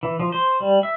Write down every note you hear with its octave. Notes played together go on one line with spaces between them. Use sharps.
E3
F3
C5
G3
E5